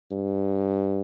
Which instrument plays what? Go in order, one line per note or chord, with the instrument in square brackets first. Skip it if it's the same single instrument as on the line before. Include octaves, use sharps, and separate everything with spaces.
[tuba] G2